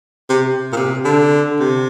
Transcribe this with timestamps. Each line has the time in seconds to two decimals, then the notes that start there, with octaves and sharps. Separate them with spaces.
0.29 C3
0.72 A#2
0.76 C3
1.05 D3
1.60 C3